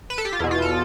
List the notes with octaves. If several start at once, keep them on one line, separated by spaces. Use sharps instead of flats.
B4
A4
G4
F4
E2 B2 E4
F4
A4